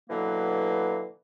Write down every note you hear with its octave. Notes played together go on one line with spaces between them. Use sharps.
B2 D3 E3 F#3 A#3